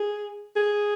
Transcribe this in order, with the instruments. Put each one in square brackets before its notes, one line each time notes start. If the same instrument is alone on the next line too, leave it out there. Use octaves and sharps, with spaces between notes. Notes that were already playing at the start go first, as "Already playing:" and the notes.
Already playing: [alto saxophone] G#4
G#4